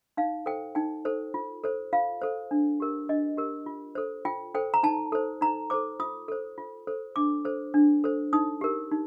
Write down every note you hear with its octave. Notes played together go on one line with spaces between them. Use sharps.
D#4 F5
A4 C5 G5
D#4 G5
A4 C5
F4
A4 C5
F4 F5
A4 C5
D4
G4 A#4
D4 D#5
G4 A#4
F4
A4 C5
F4 G5
A4 C5 G5
A#5
D#4 A5
A4 C5
D#4 A#5
A4 C5 D6
F4 D#6
A4 C5
F4
A4 C5
D4 D6
A4 C5
D4
A4 C5
D#4 D#6
G4 A#4
D#4